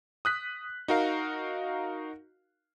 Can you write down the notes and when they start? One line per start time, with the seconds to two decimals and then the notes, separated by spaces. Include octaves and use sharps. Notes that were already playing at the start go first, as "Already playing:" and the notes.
0.25 D#6 F#6 B6
0.88 D#4 F#4 A#4 F5